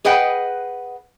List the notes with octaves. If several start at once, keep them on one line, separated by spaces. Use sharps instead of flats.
G#4 B4 D#5 F#5 G5